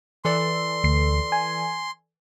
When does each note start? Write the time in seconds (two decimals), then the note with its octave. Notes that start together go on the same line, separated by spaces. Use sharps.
0.25 E3 A4 D5 C6
0.83 D2 C7
1.32 G#5